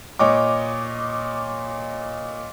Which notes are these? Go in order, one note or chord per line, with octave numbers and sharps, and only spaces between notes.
A#2 C#5 D#5 D6